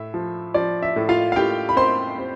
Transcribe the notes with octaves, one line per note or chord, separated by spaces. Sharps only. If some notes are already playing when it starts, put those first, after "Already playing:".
Already playing: A2 E5
F3
F3 D5
E5
A2
F4 F5
F5
A2 G4 G5
B5
C4 C5 C6
C4